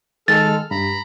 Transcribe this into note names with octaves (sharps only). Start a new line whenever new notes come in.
D#3 G#3 A4 F6 A6
G2 A#5 B5